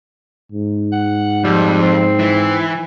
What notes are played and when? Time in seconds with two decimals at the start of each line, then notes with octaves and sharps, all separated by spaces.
0.52 G#2
0.92 F#5
1.44 F2 G3
1.82 C4
2.19 E3